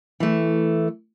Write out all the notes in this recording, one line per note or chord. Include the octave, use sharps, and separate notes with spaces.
E3 A3